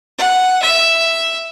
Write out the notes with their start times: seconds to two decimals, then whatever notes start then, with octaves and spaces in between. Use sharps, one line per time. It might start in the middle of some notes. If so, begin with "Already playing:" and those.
0.18 F#5
0.62 E5